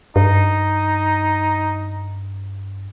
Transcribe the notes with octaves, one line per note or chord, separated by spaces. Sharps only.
G2 D#4